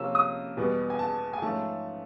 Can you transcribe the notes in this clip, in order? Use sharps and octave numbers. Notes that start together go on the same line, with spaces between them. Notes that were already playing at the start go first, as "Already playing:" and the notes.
Already playing: C3 F3 A#3 C#4 E6
D#6
E2 B2 G3 B3
G#5
A5
G#5
G#2 F3 A3 C#4 A5